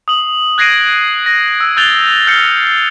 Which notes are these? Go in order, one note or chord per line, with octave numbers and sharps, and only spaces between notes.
D#6 F#7
F#6 G#6 A#6 C7 D7 D#7
A#6
E6
E6 F#6 G6 A6 F7 G7
F6 G6 C7 C#7 G7